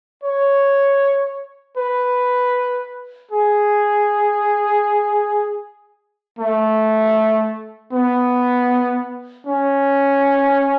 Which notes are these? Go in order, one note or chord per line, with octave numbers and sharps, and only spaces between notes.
C#5
B4
G#4
A3
B3
C#4